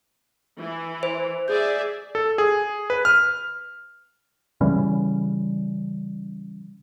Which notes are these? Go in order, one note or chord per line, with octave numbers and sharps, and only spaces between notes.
E3
C5
G#4 D5 E5 G6
A4
G#4
B4
F6
C#3 E3 G3 C#4